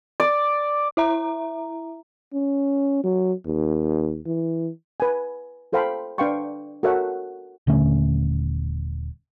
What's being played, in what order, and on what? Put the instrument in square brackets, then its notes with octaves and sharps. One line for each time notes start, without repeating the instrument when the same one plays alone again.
[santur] D5
[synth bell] E4 E5 A#5
[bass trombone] C#4
F#3
D#2
E3
[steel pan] B4 G#5
F4 A4 C5 F5 G5 B5
D4 B4 F5 G5 C6 C#6
F#4 A4 A#4 C#5 E5 F#5
[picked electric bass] D#1 D3 A3 C#4